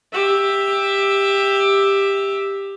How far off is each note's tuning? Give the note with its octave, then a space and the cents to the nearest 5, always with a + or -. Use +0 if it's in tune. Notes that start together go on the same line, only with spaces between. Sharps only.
G4 +15 E5 +0